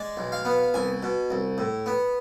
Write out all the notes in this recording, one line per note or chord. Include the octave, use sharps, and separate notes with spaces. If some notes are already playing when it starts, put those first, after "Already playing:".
Already playing: G#3 D5
B1
F5
B3
C2 G#5
B2
C2
A2
B3